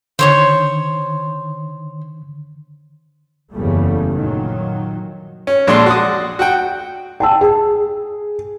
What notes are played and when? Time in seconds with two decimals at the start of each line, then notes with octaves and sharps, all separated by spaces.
0.19 D3 D#3 C5 C#5 C#6
3.52 F#1 E2 C#3 G3 A3
4.16 A#2 D#3 F#3
5.47 C#4
5.67 A#1 G#3 D4 A4 D5 C6
5.86 F#4 D5 D#6
6.39 F#4 F#5 G5
7.20 G5 A5 E6
7.41 G#4